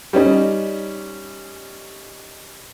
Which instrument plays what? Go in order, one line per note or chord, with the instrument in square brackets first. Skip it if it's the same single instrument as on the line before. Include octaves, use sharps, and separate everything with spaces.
[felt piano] G3 C#4 D#4